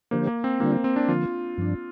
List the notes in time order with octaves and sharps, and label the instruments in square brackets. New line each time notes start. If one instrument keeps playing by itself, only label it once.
[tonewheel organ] D3 F3 D4 G4 C5 [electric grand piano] A#3
[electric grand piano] A#3
C4
[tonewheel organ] D3 G3 D4 F4 [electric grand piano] A#3
[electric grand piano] C4
C4
D4
[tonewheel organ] D3 F3 A#3 [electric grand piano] F4
[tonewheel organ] G2 F3 D4